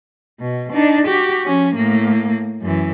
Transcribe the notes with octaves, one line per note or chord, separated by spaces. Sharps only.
B2
D4 D#4
F#4 G4
F3 C#4
A2 A#3
F#2 E3